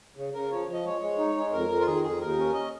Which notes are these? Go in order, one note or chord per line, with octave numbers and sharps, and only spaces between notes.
C#3
C#3 A#4
F3 C#5
F3
D#5
G#3 C#5
G#3
D#4
G#3
F2 A#4
F2
F4
D#3 G#4
F2 G#4
D#2 A#4
C#4
D#5